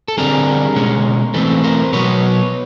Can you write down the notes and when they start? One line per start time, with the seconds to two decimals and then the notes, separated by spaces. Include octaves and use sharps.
0.08 A4
0.18 D3 G3 C4 G#4 A#4
0.76 B2 G#3 C#4
1.34 E3 A3 C4 A4 B4
1.64 A#4 C5
1.93 B2 F#3 B3 B4 C#5